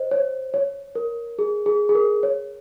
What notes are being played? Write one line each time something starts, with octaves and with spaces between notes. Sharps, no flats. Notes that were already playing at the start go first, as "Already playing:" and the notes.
Already playing: C5 D#5
C#5
C#5
A#4
G#4
G#4
G#4
A#4
C#5